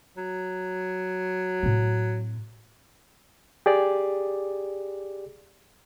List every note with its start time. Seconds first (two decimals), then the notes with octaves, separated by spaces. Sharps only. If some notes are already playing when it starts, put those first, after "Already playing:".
0.17 F#3
1.63 A2 C4
3.66 G4 G#4 D5